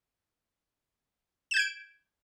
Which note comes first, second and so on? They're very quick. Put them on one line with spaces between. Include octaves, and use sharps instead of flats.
E7 G6 G#6 D7